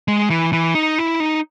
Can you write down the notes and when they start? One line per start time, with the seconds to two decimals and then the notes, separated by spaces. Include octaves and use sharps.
0.08 G#3
0.30 E3
0.53 E3
0.75 D#4
0.98 E4
1.20 D#4